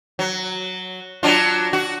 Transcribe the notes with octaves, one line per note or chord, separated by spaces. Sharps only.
F#3
F#3 D4 F4
F#4